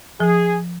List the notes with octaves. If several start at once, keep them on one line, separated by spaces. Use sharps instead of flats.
F3 G#4